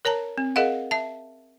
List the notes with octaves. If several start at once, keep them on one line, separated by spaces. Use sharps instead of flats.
A#4 C#5 A5 A#5
C4
G#4 A#4 D#5 F5 F#5
E5 A5